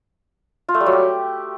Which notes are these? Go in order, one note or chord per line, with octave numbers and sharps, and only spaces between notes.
F4
A3
G3
F#3
G4